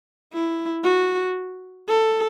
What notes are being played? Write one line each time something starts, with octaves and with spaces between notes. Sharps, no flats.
E4
F#4
A4